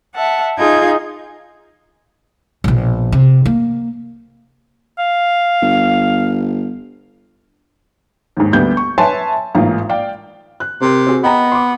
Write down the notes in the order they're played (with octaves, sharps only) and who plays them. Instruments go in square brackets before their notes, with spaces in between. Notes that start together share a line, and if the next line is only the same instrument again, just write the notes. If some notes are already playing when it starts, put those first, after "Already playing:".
[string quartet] E5 F#5 A5
D#4 F4 G#4 G6 G#6
[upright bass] A#1 B2
C3
A#3
[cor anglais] F5
[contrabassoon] G1
[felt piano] D#2 G#2
D2 G3 A#3 B3 G6
C#6
B4 C#5 E5 G#5 A5 C6
A1 G#2 A#3 F4 F5
D5 F5 G5
F#6
[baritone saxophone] C3 [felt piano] C4 A#4
[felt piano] C4 F#4 G#4
[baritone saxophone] B3 [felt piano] D#5 G5 A#5
[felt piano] C6 D6